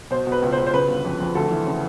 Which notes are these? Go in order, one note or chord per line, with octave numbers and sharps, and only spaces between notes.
B2 C5
B2
B4
C#2
C5
C#2
C5
C#3 B4
G1
F2
F2
D2 A4
E3
C#3